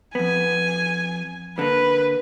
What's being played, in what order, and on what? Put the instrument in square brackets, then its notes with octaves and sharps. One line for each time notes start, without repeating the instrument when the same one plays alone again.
[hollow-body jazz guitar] F2 B3 [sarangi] G#5
[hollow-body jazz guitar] D3 A#3 [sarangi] B4